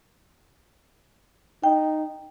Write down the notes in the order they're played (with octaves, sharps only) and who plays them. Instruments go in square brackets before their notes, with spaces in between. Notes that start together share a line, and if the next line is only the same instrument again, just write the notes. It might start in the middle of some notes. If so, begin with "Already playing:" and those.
[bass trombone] D#4 [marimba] G5